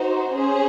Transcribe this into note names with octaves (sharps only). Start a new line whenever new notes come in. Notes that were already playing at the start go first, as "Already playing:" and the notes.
Already playing: D#4 F#4 C5
C#4 G#4 C5